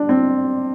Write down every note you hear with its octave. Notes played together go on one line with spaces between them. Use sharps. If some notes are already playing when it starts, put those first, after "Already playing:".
Already playing: G3 D4
C4